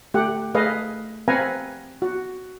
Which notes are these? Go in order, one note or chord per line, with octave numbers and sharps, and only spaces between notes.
A3 G4 F#5
A3 G#4 B4 D#5 F5
C4 B4 F5 F#5 G#5 A#5
F#4